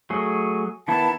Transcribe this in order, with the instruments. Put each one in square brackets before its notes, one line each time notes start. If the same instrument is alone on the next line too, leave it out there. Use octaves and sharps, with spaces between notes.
[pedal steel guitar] F#3 A3 G#4
[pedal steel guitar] D#3 B3 E4 [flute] A5